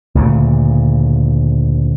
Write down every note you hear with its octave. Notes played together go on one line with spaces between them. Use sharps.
D2 A#2 C#3